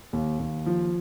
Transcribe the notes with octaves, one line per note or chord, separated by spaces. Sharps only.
D#2
D#2
F3